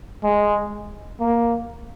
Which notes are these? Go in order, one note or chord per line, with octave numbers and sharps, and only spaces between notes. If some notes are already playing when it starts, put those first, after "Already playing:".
G#3
A#3